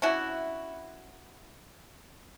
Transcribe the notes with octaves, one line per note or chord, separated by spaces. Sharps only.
C#4 D4 E4 F#4